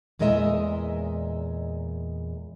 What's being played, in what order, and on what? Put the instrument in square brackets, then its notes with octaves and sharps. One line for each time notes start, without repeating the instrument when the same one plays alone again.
[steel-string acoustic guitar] E2 A#2 G#3 A#4 D#5 E5